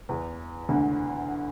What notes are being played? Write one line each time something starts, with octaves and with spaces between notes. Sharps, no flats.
E2 E3
D2 D3